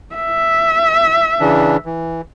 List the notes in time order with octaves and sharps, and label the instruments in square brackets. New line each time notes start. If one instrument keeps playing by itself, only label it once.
[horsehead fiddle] E5
[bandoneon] C#3 E3 D4
E3